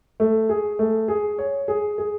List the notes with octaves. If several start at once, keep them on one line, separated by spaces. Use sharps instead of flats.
A3
G#4
A3
G#4
C#5
G#4
G#4